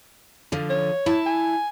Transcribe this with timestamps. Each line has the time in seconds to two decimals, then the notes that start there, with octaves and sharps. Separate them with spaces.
0.52 D3 F3
0.70 C#5
1.06 E4 A5
1.26 G#5